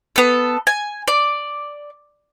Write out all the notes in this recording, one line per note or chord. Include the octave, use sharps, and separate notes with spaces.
B3 A4
G#5
D5